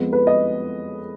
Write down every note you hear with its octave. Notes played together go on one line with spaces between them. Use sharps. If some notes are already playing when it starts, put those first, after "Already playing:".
Already playing: F2 F3 G#3 B3
B4
D#5